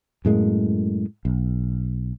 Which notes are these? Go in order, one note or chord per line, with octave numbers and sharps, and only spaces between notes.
F#2 A2 G#3 A#3
B1